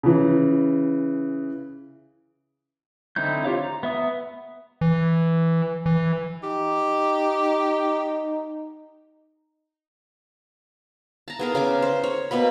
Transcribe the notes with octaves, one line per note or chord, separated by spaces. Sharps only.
C#3 E3
D3 C4 D#4 E4 G6
F4 G4 C#5 F5
A#5
B3 E5 D#6
E3
E3
D#4 G4
A5 A#5
B3 G#4 A#4
C#3 G#5 D6
C5
C#5
B2 A#3 B3 B5